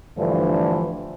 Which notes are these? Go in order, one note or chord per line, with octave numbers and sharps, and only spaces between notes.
G2 D3 E3 F3 A3